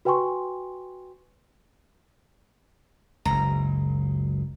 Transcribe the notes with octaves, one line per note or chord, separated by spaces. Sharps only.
F#4 B4 G5 G#5 C6 C#6
F#1 C#2 A#5